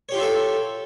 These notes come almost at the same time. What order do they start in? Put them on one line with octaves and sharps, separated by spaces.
C#5 G4 F4 E5 A4